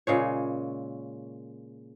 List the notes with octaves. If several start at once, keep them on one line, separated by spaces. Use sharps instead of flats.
A#2 C#3 G#3 C#5